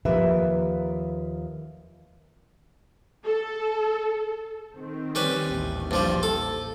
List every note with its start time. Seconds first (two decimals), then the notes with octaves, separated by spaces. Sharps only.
0.05 D#2 F3 G4 A#4 B4 E5
3.26 A4
4.75 D#3 C4
5.15 G3 C#4 B4
5.51 A1 D#2
5.91 G2 F3 G3
6.23 A4